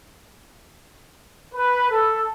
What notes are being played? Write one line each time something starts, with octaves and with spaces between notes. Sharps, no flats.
B4
A4